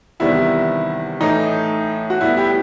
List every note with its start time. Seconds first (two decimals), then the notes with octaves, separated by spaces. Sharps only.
0.20 E2 C3 D#3 G3 B3 E4
1.21 A2 E3 A3 D#4
2.10 F#4
2.21 A2 G3 B3 E4
2.37 E4 G4